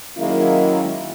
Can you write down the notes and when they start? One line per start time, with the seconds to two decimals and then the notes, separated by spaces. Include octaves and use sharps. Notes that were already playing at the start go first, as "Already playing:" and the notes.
0.17 D#3 F#3 G#3 A#3 C#4 E4